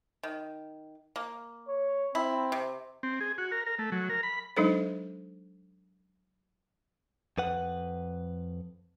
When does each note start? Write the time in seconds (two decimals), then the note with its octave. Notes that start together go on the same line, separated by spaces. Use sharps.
0.23 D#3
1.16 A#3
1.68 C#5
2.15 C4 E4
2.52 C3
3.03 C4
3.21 G#4
3.38 F#4
3.52 A#4
3.66 A#4
3.79 A3
3.92 F#3
4.09 A#4
4.23 B5
4.57 F#3 G#3 D4 D#4 A4 C5
7.38 F2 B4 F#5